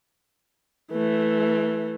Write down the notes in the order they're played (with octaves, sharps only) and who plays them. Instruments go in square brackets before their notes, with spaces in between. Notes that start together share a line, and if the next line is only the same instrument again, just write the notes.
[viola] E3 A3